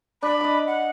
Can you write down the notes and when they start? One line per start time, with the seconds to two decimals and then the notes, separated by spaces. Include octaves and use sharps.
0.23 D4 D5 B5
0.41 D#5 D6
0.67 F#5